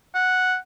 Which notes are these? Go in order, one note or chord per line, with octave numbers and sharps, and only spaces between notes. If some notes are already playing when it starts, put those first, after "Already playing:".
F#5